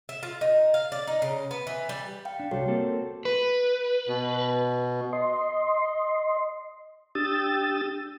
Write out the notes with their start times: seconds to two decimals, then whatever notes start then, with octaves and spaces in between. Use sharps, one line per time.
0.09 E5
0.23 F4
0.41 D#4
0.74 F5
0.92 D5
1.07 D#4
1.22 C#3
1.51 B3
1.67 E3
1.89 G3
2.25 F5 G5
2.40 D4
2.51 C2 G3 F#4 A4 C#5
2.68 A#3 C4 A4
3.25 B4
4.08 B2
5.13 D#5 C6
7.15 D4 G4 G5 D#6 E6 A6